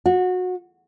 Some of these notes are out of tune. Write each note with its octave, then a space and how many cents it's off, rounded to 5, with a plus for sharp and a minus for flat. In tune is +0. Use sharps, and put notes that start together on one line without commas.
F#4 -20